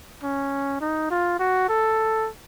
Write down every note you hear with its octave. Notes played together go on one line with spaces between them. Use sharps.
C#4
D#4
F4
F#4
A4